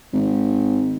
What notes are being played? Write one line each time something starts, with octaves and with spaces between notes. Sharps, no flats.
G#1